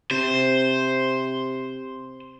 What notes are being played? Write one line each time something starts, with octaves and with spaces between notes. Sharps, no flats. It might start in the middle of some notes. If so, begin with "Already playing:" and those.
C3 C5